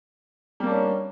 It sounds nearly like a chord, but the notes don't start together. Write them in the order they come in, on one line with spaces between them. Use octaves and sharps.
G3 A#3 D4 C#4